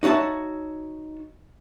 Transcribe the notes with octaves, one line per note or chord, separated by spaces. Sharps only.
D#4 F#4 C#5 E5 A5